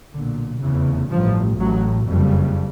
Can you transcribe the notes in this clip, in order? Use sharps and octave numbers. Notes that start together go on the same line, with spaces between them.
B1 A#2 D3
F1 E2 C#3 E3
A1 G2 F3
A1 A2 F#3
F#1 F2 C#3 G3